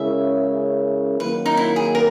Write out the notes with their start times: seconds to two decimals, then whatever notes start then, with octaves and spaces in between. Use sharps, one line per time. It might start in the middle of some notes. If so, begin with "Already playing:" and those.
Already playing: C#3 G#3 C#4 E4 A#4 E5
1.20 D#3 F#3 A#3 B4
1.46 D#4
1.57 E4
1.76 G#4
1.95 A#4